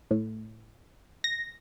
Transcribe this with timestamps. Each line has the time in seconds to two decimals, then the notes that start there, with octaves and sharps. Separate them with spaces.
0.11 A2
1.24 A#6